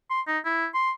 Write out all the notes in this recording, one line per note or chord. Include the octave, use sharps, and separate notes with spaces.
C6
D#4
E4
C6